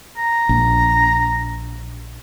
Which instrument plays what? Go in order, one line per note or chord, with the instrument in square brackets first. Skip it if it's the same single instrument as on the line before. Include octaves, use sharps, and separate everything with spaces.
[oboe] A#5
[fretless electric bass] A#1